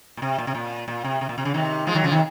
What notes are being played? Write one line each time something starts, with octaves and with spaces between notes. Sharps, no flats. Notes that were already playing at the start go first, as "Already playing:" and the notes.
A#2
C3
A#2
C3
A#2
A#2
C3
C3
A#2
C3
C#3
C3 D#3
F3 G#3
D#3 F#3
C#3 F3
C3 D#3